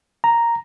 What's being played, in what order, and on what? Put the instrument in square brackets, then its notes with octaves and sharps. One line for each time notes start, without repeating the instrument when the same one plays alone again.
[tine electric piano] A#5